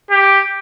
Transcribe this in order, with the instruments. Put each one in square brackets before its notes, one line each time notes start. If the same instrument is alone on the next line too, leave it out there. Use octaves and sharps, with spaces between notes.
[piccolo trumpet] G4